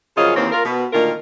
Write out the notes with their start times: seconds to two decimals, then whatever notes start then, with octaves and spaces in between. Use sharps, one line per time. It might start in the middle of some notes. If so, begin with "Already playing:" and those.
0.17 F#2 C#3 F3 F4 C#5 D#5
0.36 D#2 E3 A#3 C4 C5 C#5
0.52 F4 A#4
0.65 B2 B3
0.93 D2 A#2 D#3 F4 A#4